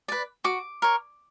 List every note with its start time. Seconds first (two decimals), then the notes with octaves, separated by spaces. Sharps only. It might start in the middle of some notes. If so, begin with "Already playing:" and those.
0.08 B4 D5
0.44 F#4 D6
0.82 A#4 C#5